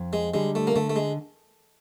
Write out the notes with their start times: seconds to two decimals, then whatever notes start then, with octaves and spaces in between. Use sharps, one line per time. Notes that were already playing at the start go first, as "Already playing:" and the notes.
Already playing: F2
0.13 G#3
0.34 D3 G3 G#3
0.55 A3
0.67 A#3
0.76 D3 A3
0.90 A3
0.96 G#3